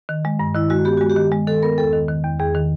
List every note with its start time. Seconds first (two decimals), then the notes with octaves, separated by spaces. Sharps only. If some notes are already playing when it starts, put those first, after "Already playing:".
0.09 D#3
0.25 G#3
0.39 G2
0.55 D#3 E4
0.70 G#3 F#4
0.85 B3 G4
0.97 G#3 F#4
1.10 G4
1.16 D#3
1.32 G#3
1.47 D#3 A4
1.63 B3 A#4
1.78 E2 A4
1.93 D#3
2.08 D#3
2.24 E2
2.39 E2 G#4
2.54 D#3